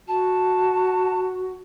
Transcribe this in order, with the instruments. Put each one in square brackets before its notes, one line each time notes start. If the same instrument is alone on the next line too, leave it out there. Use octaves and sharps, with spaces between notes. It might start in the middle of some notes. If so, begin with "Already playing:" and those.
[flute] F#4 [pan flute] A5